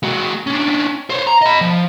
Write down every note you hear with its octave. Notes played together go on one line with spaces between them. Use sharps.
G#3 F#4
C#4 D4
C5 C#5
A#5
D#5 B5
F3